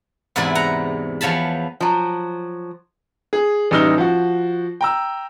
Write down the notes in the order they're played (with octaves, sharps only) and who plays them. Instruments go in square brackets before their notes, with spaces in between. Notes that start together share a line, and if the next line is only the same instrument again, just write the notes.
[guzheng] E2 G#2 C3 E4 D5 G#5
F#5 A#5
E2 F3 C#5 A5 B5
[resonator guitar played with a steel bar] F3 F#3
[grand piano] G#4
A1 G3 D#4 E6 F6 G7
F3 F#4
G5 A#5 E6